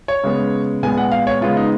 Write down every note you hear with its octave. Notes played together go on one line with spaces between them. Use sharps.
C#5
C#3 G#3 B3
A#2 G#3 B3 G#5
F#5
F5
C#5
C#3 G#3 B3 F4
D#4